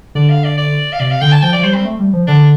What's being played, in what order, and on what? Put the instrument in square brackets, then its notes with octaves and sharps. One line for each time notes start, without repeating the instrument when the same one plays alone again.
[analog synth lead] D3 [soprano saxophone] D5
[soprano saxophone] F5
D5
D5
F5
[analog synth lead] C3 [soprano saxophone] D5
[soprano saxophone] F5
[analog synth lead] D3 [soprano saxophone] G5
[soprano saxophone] A5
[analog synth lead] F3 [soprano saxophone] G5
[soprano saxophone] D5
[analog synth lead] F3
[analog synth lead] G3 [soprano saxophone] C5
[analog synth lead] G3 [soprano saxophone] C4
[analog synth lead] A3
G3
F3
[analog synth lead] D3 [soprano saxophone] D4